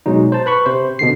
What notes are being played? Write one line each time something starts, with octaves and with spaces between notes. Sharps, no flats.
B2 F#3 G#3 D#4
C5 A5
B4 B5 C#6
C3 C5
B2 D3 C7